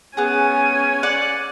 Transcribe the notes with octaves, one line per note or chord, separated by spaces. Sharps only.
B3 C#4 G#4 G#5
D5 F#5